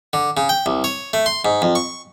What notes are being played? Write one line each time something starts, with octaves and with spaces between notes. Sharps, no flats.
D3
C#3
G5
C2
C#5
A3
C6
G#2
F2
C#6